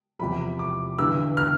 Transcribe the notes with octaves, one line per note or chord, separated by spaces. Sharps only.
E2 C3 F3 B5
D6
G1 G2 E3 E6
F6